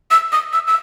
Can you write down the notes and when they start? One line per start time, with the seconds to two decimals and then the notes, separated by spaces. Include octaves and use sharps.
0.11 E6
0.32 D#6
0.53 E6
0.67 E6